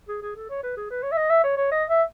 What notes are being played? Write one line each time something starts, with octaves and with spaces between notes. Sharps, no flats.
G#4
G#4
A4
C#5
B4
G#4
B4
C#5
E5
D#5
E5
C#5
C#5
D#5
E5